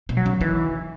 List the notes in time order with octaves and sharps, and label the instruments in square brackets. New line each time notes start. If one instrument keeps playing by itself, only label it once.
[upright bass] B2
[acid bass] F#3
[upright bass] C#3
[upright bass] D#3 [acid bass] E3